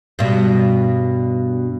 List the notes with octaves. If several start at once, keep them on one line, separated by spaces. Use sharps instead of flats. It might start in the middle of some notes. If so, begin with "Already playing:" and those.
G2 B2